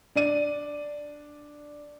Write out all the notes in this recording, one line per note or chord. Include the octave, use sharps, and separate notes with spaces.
D4 D5 D#7